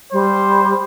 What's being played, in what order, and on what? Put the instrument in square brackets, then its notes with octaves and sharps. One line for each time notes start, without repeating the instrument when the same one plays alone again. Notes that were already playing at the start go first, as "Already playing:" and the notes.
[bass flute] G3 [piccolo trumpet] C5